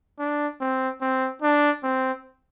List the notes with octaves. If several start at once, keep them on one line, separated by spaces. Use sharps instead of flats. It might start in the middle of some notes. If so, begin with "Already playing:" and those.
D4
C4
C4
D4
C4